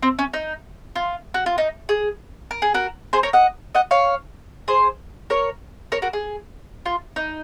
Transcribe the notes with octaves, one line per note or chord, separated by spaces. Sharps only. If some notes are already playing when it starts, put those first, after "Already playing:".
C4
C#4
D#4
F4
F#4
F4
D#4
G#4
A#4
G#4
F#4 A#4
G#4 C5
A#4 C#5
D#5 F#5
D#5 F#5
C#5 F5
G#4 C5
A#4 C#5
A#4 C#5
F#4 A#4
G#4
F4
D#4